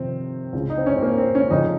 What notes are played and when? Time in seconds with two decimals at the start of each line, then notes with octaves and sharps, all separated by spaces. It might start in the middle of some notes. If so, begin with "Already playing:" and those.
Already playing: F2 C3 D#3 C4
0.53 C#2 C#3
0.70 D#4
0.78 C4
0.86 C#4
0.96 C4
1.02 A#3
1.18 C4
1.35 C#4
1.50 F2 C#3 D#4